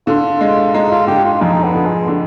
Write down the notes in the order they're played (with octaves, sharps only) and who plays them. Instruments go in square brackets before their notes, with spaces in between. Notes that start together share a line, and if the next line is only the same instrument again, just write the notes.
[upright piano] D3 [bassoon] F4
[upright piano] G#3
[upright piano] G#3 [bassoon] D#4
[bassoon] F4
[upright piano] D3 [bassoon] G4
[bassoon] F4
[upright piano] F2 [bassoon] D#4
[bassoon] B3
[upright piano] D3
[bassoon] G#3
[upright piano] D3